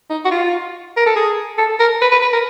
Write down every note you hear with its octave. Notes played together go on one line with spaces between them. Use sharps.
D#4
F#4
F4
A#4
A4
G#4
A4
A#4
B4
B4
B4
A#4